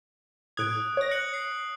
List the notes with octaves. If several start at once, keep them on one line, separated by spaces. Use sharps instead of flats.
A2 D#6 F#6 G#6 D7
C#5 A#6
F#6 C#7 F#7
C7